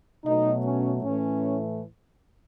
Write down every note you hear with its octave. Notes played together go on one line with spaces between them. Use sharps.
B2 F#3 A3 D#4
C#4
A2 E3 A3 C#4